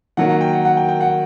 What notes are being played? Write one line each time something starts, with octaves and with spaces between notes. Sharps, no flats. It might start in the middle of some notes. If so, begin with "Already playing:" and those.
D#3 F#3 A#3 F#5
F#5
G5
F#5
F#5
G5
G5
F#5